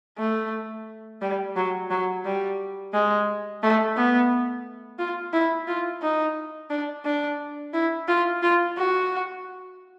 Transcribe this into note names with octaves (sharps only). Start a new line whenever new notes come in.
A3
G3
F#3
F#3
G3
G#3
A3
B3
F4
E4
F4
D#4
D4
D4
E4
F4
F4
F#4